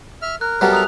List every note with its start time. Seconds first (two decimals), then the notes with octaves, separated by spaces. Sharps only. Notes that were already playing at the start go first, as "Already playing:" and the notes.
0.22 E5 F6
0.41 A#4 F#6
0.61 F#3 G3 B3 A4 A#4 E5 A#5 F#6
0.73 D#6 F#6 F7